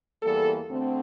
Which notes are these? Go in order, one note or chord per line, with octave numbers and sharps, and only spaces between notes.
E2 E3 G3 A#3 A4
D2 D3 A3 C4